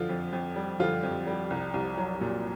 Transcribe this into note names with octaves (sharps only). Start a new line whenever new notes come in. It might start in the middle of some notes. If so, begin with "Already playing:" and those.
Already playing: D3 F3 F4
F2
F2
G3
D3 F3 F4
F2
G3
C2
C2
F#3
A#2